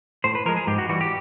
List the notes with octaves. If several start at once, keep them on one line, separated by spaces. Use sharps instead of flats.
A2 C5
B4
F3 G#3 A#4
G#4
G#2 G4
F#4
E3 G3 F#4
G4